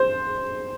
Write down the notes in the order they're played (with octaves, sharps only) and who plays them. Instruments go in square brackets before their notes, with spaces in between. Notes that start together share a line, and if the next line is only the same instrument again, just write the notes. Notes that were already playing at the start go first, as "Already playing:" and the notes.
Already playing: [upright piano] C5